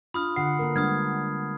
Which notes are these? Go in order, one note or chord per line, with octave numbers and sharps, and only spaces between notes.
D4 F4 B5 D#6 F6
D3 F#5 C7
A#3 B3 A#4
G3 G#3 D4 D#6 F6 G#6